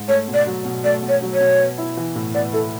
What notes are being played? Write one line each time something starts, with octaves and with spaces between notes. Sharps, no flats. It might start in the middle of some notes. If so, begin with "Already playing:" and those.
Already playing: G#2
A3 C#5
B2
D5
F#3
B2
A3 D5
B2
C#5
F#3
C#5
B2
B3
E4
E3
A2
B3 D5
E4 A4